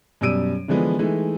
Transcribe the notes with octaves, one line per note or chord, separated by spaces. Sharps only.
F#2 B2 G3 E6 D7 D#7
D3 E3 F3 G#3 B3
E3 G#3 A3 D#4